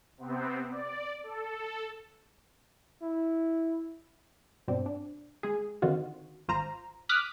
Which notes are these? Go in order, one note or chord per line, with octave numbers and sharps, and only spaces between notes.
C3 B3 C4
D5
A4
E4
G2 B2 C4 D4
D4
G#3 G#4
D3 D#3 C4 F4 F#4
G#1 F4 C5 A#5
D6 D#6 F6 F#6 B6